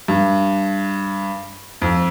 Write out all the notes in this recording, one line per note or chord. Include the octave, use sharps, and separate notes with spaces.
G2
F2